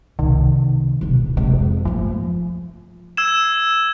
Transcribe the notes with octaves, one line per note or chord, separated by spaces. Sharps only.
C2 B2 D#3
D1 B2
C3 G#3
F2
F3 A3 A#3
E6 G#6 E7